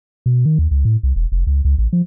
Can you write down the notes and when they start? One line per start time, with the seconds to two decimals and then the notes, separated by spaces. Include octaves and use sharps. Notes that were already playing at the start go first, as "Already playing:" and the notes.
0.26 B2
0.45 D#3
0.58 D#2
0.71 C#2
0.85 A2
1.03 C2
1.16 E1
1.32 F1
1.47 C#2
1.65 C#2
1.78 A1
1.93 F3